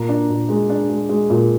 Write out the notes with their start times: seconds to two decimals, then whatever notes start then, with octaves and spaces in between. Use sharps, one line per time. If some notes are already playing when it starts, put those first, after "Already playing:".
Already playing: A#2 A#5
0.09 D4
0.29 A#2
0.49 G#3
0.70 D4
0.90 G#3
1.09 G#3
1.30 A#2